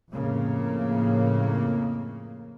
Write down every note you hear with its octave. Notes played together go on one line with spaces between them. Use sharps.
F2 A2 C#3 A#3